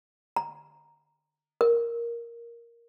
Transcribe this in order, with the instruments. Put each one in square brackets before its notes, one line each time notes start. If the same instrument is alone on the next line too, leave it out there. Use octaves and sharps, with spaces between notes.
[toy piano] A#5
A#4